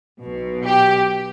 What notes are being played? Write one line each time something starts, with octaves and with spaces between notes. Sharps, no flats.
B1 B2
G4